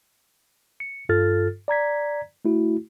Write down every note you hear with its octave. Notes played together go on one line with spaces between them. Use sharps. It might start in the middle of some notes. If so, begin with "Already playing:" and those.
C#7
G2 F4 A4 F6 A6
D5 A#5 G#6 B6
A3 E4 F#4